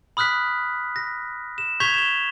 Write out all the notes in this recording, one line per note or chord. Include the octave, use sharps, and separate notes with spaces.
B5 D#6 F6 F#6 B6
A#6
E7
C#6 G6 G#6 B6 F7 G7
E7 G7